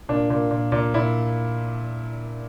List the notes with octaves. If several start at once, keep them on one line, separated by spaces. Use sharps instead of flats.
A#2 D4
A#2
A#2
A#2
A#2 E4